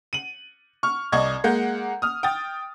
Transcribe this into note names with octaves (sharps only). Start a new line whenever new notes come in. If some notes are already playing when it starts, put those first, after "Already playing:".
D#7 F#7
C#6 F6
C2 D5 D#5 C#6 G#6
G#3 A#3 F#5 G6
D#6 F6
G5 D#6 A6